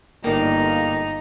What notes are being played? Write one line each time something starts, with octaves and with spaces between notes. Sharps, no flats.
G1 D#3 A#3 D#4 D5